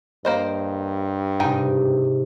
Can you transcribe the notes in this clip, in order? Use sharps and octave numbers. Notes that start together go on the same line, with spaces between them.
G2 A#3 C5 D#5
G#2 C3 D#4 G5 G#5